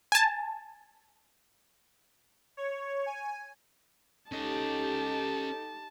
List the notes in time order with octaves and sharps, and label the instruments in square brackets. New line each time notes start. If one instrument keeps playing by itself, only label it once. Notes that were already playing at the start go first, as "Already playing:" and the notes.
[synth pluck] G#5 A5
[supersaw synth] C#5
G#5
[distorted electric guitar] C#4 D#5 [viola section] D#4 G4 [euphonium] A4 [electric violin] A5